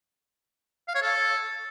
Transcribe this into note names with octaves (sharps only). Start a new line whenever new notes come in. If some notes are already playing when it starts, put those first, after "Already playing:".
F5
C#5
A4